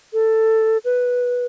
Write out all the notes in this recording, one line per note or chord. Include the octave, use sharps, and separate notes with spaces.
A4
B4